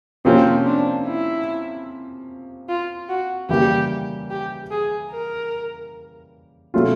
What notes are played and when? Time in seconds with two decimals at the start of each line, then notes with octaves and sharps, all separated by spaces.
0.25 C3 F3 A#3 C4 C#4
0.66 D4
1.06 E4
2.69 F4
3.09 F#4
3.49 C#3 E3 G3 A#3 G4
4.30 G4
4.71 G#4
5.12 A#4
6.74 B2 F#3 A3 C#4 F4